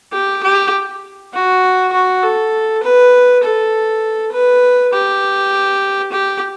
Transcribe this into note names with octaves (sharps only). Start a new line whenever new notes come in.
G4
G4
F#4
F#4
A4
B4
A4
B4
G4
G4